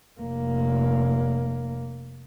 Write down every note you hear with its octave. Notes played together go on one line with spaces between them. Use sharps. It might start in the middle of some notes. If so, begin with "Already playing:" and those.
F1 A#3